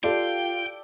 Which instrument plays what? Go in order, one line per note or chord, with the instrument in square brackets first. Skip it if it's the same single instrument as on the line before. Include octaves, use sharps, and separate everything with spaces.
[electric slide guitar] F4 [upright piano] G4 A4 D5 [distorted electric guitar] G5